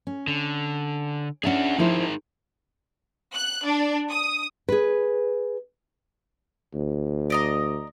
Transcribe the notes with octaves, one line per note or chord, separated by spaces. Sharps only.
C#4
D3
C#4 D4 G#4 E5 F#5
F3 D#4 E4 G#4 A#4 C5
F#6
D4
D#6
G#4 B4
D2
D5 D#5 A#5